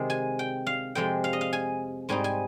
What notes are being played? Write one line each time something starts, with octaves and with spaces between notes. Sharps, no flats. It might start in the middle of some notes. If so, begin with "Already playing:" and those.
Already playing: C3 D#3 G#3
G#5
G5
F5
F2 C3 F3 G#3 G5
F5
D#5
F5
G#5
G#2 G3 C4 D#4 G#5
G#5